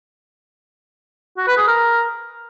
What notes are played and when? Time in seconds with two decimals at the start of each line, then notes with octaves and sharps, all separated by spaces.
1.38 F#4
1.47 B4
1.57 G#4
1.67 A#4